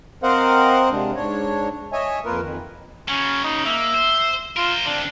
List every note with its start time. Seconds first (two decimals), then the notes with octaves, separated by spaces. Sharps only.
0.23 C4 A#4 C5 D#5 F5 F#5
0.91 C3 G#3 D4
1.16 G#2 D4 C#5
1.93 C#5 D#5 E5 G#5
2.25 F2 A#3 F4 A#4 B4
2.41 F2 D#3
3.08 C#3 F#3 C#4
3.44 D#4
3.66 A#3 E5
3.94 C5
4.57 F4 A#4 C5
4.86 D3 C4 D4